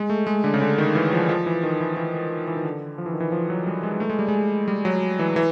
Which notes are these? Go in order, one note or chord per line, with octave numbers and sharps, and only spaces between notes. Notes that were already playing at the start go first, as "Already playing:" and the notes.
Already playing: G#3
A3
G#3
D3
C#3
D3
D#3
E3
F3
F3
E3
D#3
E3
E3
E3
D#3
D3
F3
E3
D#3
E3
F3
F#3
G3
G#3
A3
G#3
G3
G#3
G3
F#3
E3
E3